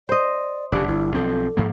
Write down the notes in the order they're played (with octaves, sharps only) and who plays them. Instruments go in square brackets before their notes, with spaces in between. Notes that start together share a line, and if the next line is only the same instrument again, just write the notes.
[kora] C5 D#5 [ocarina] D5
[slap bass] F1 C#3 [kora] D4 [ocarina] G4
[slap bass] G1 [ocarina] E4
[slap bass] B1 F3 C4 [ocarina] A4
[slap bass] G#2 F3 A#3